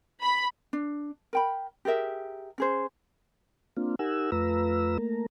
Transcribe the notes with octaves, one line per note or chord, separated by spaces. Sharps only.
B5
D4
A#4 G5 B5
G4 G#4 A#4 E5
C#4 G#4 C5
A#3 C4 D4 F4
D#4 G4 A#4 F#5 G#5 E6
F2 A3 F4 B4 A#5 E6
A3 A#3 A#4